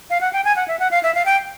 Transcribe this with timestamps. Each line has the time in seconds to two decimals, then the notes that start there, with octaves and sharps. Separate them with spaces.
0.10 F5
0.21 F#5
0.33 G5
0.45 G#5
0.56 F#5
0.68 E5
0.79 F#5
0.91 F5
1.03 E5
1.15 F5
1.26 G5